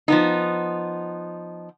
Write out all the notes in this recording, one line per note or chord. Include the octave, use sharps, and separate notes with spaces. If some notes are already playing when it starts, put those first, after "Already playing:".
F3 B3 D#4